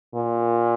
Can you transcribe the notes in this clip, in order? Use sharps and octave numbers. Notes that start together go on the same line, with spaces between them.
A#2